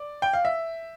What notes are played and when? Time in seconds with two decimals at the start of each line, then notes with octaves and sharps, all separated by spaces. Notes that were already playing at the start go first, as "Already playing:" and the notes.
Already playing: D5
0.22 G5
0.33 F5
0.45 E5